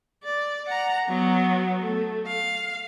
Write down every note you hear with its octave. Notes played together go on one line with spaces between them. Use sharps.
D5
F#5 A#5
F#3 B3
A3
F5